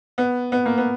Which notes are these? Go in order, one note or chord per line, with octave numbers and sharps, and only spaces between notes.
B3
B3
A#3
B3